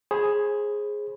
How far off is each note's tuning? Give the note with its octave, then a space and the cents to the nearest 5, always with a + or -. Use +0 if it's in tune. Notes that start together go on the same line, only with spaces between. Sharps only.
G#4 +0 C5 +30 B5 +0